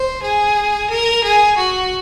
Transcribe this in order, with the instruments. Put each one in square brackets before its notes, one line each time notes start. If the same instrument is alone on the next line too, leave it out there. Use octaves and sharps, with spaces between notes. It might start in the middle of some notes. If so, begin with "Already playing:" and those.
Already playing: [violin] C5
G#4
A#4
G#4
F#4